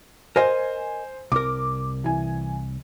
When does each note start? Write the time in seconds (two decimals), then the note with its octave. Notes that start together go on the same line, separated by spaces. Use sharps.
0.36 A#4 C5 D#5 F5 G#5
1.32 C2 A#4 D6
2.04 E3 G#5